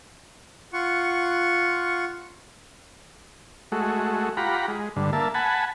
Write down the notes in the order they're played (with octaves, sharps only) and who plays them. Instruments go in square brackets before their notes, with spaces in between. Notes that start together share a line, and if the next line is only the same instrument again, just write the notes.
[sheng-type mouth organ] F4 F#5 C#6
[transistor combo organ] G#3 A3 F#4
F4 G4 F#5 A#5 B5
G#3
G2 D3
A#3 E5 A5
F#5 G#5 A5 B5